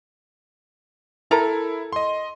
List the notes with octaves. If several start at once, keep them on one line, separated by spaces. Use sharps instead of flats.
E4 A4 A#4 A#5
D#5 C6